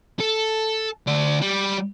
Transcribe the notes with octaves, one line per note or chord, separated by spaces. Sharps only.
A4
D2 D5
G3